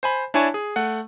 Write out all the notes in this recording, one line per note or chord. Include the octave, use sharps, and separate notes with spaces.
C5 G#5 B5
D4 E4 C#5 G#5 A5 C#6
G#4
A3 F#5